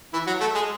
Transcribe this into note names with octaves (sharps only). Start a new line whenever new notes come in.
E3 E4
F#3 F#4
A3 A4
G#3 G#4